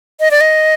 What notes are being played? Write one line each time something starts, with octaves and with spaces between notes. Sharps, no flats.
D#5
D5
D#5